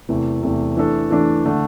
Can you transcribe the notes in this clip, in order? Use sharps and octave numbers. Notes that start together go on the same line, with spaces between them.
E2 C3 E3 A3
E2 C3 E3 A3
E3 A3 D4 A4
E3 A3 D4 A4
D3 A3 D4